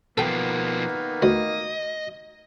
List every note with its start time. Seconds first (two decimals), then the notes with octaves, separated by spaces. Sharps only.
0.18 B2 D#3 F3 A#3 B3 A4 G5
1.22 D2 D#5